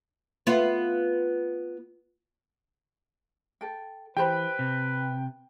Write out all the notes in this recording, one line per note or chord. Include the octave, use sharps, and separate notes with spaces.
B3 F4
A4 G5
E3 G4 B4 C5 G5 B5
C3